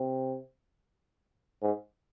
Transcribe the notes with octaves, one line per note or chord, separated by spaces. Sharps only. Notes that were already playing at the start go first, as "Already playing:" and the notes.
Already playing: C3
G#2